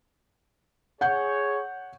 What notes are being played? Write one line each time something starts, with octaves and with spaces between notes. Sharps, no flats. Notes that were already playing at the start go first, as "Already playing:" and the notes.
G#4 C#5 F#5 G6